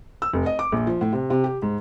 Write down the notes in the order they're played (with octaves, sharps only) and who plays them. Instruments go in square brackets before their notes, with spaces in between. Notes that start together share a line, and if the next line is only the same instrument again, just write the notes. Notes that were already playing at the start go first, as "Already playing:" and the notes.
[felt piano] E6
F1
D#5
D6
A#1
F3
A2
C3
C3
G4
G#2